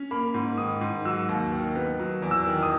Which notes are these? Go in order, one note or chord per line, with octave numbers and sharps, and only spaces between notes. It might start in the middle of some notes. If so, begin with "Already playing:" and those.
Already playing: C#4
A#3 B5
G#2
D#3 D#6
G#2
F#3 E6
D#2
D#3
B3
F#3
E2
E6
D#3
D#6